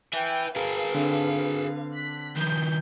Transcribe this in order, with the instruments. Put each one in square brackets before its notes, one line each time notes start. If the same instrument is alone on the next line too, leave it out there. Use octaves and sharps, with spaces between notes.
[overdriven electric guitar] B4 E5 [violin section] G5 G#5
[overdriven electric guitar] G#4 A#4 [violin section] B4 F5
[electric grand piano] D3 C4 D4
[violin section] F#6 B6
[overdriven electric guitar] D#3 F3 [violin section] G6